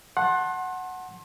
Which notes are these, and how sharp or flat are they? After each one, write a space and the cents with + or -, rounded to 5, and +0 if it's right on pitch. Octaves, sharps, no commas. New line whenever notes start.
F#5 +0 A5 +0 C6 +35